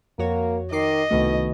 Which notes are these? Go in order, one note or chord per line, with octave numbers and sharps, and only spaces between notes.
F2 A#3 F#4 C#5
D#3 D#5 D6 C7
C2 B2 D#3 A3